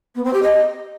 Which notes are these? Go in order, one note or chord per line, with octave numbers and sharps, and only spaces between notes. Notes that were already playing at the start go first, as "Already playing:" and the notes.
B3
C4
G4
D#5